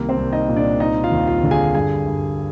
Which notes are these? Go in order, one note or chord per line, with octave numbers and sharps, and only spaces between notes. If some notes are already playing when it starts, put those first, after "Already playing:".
Already playing: C2 D#3 A#3 A#4
C4 C5
C2
D#4 D#5
A#2
D4 D5
C4 D#4 D#5
F4 F5
D#2
F4 F5
D3
G#4 G#5
G2 G#4 G#5
G2